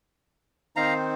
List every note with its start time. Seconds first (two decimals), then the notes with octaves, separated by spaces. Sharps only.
0.76 D#3 C4 D#4 C5 F5 A#5